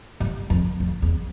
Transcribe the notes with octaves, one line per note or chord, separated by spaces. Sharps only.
G2
F2
F2
E2